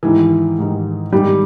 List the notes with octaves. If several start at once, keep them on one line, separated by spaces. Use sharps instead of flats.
G#2 D#3 E3 G#3 D#4 G4
G#2 D#3 G#3 D#4 G4
G#2 D#3 G3 G#3 D#4 G4